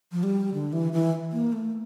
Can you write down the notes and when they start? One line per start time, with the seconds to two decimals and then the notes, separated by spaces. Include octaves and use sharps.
0.12 F3
0.23 G3
0.54 D3
0.73 E3
0.93 E3
1.33 A#3
1.53 A3